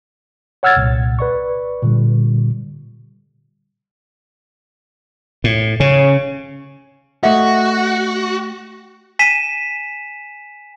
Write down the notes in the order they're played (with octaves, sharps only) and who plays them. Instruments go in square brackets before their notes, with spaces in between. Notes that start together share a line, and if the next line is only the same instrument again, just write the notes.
[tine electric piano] C#5 F#5 E6 F6 G#6 A6
C2 A#2
B4 D5 C#6
A#2 D3 G3
[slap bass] A2
[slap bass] C#3 [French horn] C#4
[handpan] A3 D#5 F#5 [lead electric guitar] F#4 [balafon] E5
[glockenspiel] G#5 B6 D#7 E7